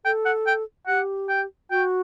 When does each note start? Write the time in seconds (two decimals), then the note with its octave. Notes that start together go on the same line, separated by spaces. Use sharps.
0.05 A4 G5
0.25 F#5
0.47 G5
0.87 G4 F#5
1.29 G5
1.71 F#4 G5